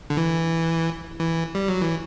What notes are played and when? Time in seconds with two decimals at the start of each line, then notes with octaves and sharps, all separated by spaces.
0.10 D3
0.17 E3
1.20 E3
1.55 G3
1.68 F#3
1.82 E3